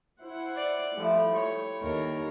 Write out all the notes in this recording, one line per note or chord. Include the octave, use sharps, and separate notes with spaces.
E4 C5 F#5
D5
F3 G3 A3 E4
C#5
D#2 A#4 C#5